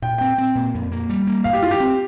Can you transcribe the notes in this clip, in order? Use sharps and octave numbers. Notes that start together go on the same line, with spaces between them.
A#2 G5
C4 G5
C4
A#2
F2
A#3
G3
A#3
G2 F5
G4
G2 F4
G4
C4